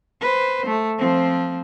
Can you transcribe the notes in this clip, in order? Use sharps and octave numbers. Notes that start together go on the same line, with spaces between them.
B4 C5
A3
F3 C4